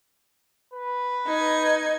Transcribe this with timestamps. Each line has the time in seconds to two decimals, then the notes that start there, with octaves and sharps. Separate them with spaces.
0.73 B4
1.27 D#4 G#6